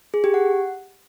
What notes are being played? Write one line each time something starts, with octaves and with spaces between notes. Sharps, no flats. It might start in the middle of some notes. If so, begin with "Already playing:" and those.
G#4
G4
F#5